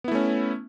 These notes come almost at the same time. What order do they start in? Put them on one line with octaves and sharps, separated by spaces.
B3 E4 A3 C#4